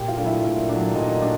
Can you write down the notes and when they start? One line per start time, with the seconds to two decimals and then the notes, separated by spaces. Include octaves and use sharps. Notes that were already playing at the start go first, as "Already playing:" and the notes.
Already playing: A#2 G4 G5
0.08 F4 F5
0.17 F#3 A3 D4
0.26 E4 E5
0.43 A#2
0.69 F#3 A3 D4
0.95 A#2 D#4 D#5
1.22 D4